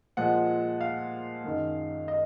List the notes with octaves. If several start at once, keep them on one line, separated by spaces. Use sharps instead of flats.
A#2 F3 G#3 F#5
F5
F#2 D#3 G#3
D#5